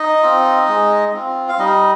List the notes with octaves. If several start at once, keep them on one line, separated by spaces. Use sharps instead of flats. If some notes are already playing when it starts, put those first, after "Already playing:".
Already playing: D#4 D#5
C4 F4
G#3
C4 F4
F5
G3 D#4 D#5